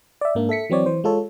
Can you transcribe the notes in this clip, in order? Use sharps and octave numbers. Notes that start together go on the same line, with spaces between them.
D5 E5
G#2 A#3 D4
A4 E5 B6 C#7
E3 F#3 C4 C#5 D5
E3 C5
G#3 F4 A4 C#5